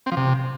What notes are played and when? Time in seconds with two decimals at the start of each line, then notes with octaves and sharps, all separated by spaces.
0.06 C4
0.12 F3
0.17 C3